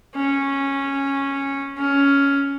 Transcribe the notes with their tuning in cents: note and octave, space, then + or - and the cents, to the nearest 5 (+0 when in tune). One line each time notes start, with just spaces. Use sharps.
C#4 -10
C#4 +10